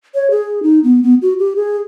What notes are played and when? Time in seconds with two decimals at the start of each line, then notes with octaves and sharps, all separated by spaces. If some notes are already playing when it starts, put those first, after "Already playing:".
0.15 C#5
0.31 G#4
0.63 D#4
0.84 B3
1.03 B3
1.22 F#4
1.39 G4
1.56 G#4